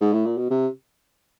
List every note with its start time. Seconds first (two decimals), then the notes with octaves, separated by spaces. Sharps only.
0.01 G#2
0.13 A2
0.26 A#2
0.37 B2
0.50 C3